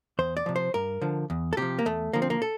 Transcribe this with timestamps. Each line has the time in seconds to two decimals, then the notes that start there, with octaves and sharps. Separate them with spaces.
0.19 E2 C5
0.37 D5
0.46 C3 F3
0.56 C5
0.74 G2 A#4
1.02 D3 F3
1.30 E2
1.53 A4
1.57 C3 F3 G4
1.79 A#3
1.85 E2 A3
2.13 D3 F3 A#3
2.22 C4
2.30 A#3
2.42 A4